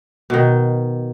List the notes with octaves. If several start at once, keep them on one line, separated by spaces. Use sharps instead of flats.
B2 D#3